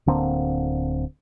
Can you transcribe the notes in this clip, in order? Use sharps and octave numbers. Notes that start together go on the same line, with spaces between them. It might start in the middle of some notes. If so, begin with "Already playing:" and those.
D1 D3 A#3 C4